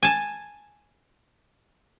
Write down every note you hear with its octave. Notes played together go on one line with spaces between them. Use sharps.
G#5 A5